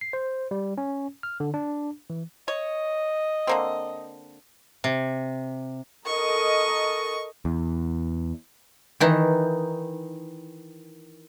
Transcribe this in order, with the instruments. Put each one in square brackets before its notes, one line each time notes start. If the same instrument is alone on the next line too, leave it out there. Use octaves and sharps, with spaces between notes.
[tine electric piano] C7
C5
G3
C#4
F6
D3
D4
E3
[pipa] C#5 [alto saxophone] D#5
[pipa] D3 A#3 C4
[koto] C3
[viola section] A4 A#4 D#5 [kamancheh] C#6
[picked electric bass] E2
[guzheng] D#3 E3 D#4